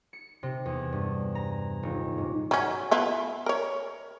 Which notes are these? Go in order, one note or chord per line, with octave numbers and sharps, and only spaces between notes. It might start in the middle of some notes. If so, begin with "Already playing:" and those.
C#7
C3
E2
G2
A#5
D#1
G#2
F#3 C#4
B3 E4 F4
A#4 C#5